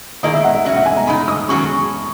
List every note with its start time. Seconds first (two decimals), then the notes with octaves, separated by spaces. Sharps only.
0.23 D#3 A#3 E4 G#4 D#5
0.34 E5
0.44 F#5
0.55 E5
0.65 B2 F#3 C#4 F#4 E5
0.76 F#5
0.86 G#5
0.96 A#5
1.07 C#3 G#3 D#4 B5
1.28 D#6
1.49 D#3 F#3 C#4 G#4 C#6